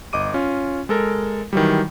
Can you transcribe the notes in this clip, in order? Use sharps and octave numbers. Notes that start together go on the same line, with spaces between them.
G1 D#5 D6 D#7
C#4 F4
G#3 A4 A#4
D#3 E3 F#3 G3